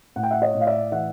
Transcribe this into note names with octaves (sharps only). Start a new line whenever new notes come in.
A2 F#5
G5
E5 F#5
C#5 D#5
A2
F5
D5 E5
E3 E5 F#5